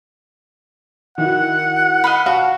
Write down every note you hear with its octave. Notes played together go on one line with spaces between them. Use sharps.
D#3 E4 F#4 F#5
D#5 F5 B5
F#4 F5 A5